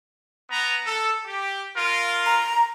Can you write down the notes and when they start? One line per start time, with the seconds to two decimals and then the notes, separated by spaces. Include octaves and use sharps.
0.50 B3 A#5
0.86 A4
1.27 G4
1.76 F4 A#4
2.26 A#5